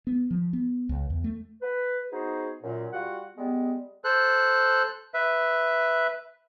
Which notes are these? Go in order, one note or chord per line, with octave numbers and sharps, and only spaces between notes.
B3
F3
B3
C#2
E2
A3
B4
B3 D#4 F#4 G#4 C5
F#2 A#2
G3 F4 F#4 F#5
G3 G#3 B3
A4 C5 F#6
B4 E5